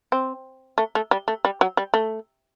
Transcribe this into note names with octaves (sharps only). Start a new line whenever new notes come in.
C4
A3
A3
G3
A3
G3
F#3
G3
A3